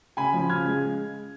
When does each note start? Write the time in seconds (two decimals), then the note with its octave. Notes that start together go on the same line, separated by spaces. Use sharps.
0.17 C#3 G#5 B5
0.34 F3
0.50 C#3 F6 G#6
0.66 G#3